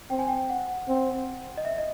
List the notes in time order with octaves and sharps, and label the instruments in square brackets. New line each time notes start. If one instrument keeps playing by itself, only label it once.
[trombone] C4 [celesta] G5
[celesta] G#5
G5
F#5
[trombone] C4
[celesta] D#5
E5
D#5